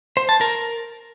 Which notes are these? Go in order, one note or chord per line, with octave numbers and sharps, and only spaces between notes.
C5
A5
A#4